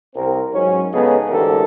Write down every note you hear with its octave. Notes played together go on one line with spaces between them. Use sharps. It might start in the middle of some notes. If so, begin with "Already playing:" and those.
C2 C4 A#4
G#2 F#3 C#4
C#3 G#3 B3 D#4 G#4 A4
D2 G#2 E3 G4 A4 A#4